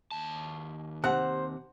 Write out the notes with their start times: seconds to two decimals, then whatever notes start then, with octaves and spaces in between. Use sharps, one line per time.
0.12 D#2 A5
1.04 C3 C5 F#5